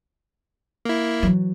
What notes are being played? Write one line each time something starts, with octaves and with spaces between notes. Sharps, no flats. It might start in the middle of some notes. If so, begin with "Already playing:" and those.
A#3 E4
E3 F#3